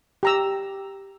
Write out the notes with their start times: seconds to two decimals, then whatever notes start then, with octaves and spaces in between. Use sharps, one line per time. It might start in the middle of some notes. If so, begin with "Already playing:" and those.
0.23 G4 A#5 E6